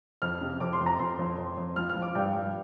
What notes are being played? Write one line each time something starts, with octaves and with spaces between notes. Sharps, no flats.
F2 F6
C3
F2 D6
C6
F2
A#5
F2 C6
F2
F2
F2
F3 F6
F6
F3
D6
G2 G5
G2